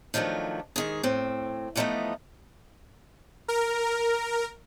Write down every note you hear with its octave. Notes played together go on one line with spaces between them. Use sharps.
D#3 F3 F#3 A3 D4
G#2 D#3 G#4
A2 C4
E3 F3 G3 A3 B3 D#4
A#4